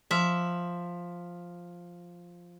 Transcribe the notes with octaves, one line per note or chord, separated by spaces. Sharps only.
F3 E5